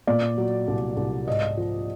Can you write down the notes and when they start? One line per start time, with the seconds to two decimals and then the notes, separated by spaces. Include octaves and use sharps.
0.07 A#2 D5
0.38 F#3
0.68 C2
0.97 C2
1.28 G#2 D#5
1.57 F3